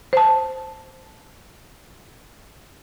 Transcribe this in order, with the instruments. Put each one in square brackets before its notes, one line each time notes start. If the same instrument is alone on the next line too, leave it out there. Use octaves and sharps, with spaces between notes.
[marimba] C5 A5